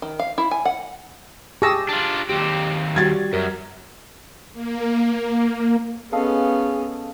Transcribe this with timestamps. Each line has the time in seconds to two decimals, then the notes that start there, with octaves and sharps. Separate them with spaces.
0.02 D#3
0.19 F5
0.38 E4
0.51 G#5
0.65 F#5
1.62 G4 G#4 A5 C#6 E6 A#6
1.89 D4 F4
2.29 D#2 C4 G4
2.96 G3 F#4 G#6 A6
3.33 F#2 A#4
4.53 A#3
6.12 B3 C#4 G#4 A4 D#5 F5